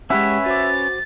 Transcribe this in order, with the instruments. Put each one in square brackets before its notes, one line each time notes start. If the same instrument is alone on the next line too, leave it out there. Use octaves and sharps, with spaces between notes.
[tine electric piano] G#3 G4 F#5 [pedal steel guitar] C#4 B4 C#5 [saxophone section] E5
[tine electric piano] F#4 C5 D6 [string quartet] A6